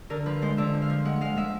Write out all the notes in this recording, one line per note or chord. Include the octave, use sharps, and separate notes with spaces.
D3 A#4
F3 B4
G#3 C5
D3 E5
F3
F5
F3
G#3 F#5
G#3 F5
G#3 E5